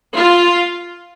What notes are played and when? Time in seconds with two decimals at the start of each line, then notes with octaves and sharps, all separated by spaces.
0.15 F4